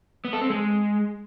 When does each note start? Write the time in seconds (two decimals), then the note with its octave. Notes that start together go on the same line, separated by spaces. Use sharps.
0.25 B3
0.33 A4
0.41 C4
0.50 G#3